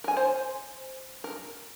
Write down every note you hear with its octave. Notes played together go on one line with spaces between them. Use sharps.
A#4 G#5
C5
A#4